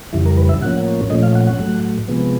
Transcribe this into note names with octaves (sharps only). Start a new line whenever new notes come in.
F2 C#3 E3 G3 E4
A#4
B4
E5
A2 F3 A#3 C#4 F#5
A#2 F3 A3 C#4 D#5
F5
F#5
F#5
A2 F#3 A3
C3 F3 G#3 B3